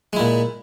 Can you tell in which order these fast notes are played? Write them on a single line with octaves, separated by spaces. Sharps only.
G#3 E4 A#2